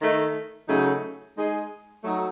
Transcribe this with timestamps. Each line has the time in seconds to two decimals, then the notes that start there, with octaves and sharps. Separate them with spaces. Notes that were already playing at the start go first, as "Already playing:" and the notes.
0.01 D#3 A3 D#4
0.69 C#3 F#3 A3 D#4 G#4
1.36 G#3 D#4 G#4
2.03 F#3 A3 D#4 F#4